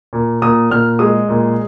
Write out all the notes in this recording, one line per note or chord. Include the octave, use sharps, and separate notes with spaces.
A#2
A#2 D#6
A#2 F6
G#3 D#6
A#2